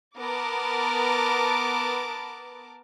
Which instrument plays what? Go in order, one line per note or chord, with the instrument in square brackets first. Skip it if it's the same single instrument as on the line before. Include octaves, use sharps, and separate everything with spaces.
[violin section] B3 A#4 A5 D6